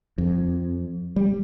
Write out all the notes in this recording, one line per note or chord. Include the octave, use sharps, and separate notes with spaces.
F2
G3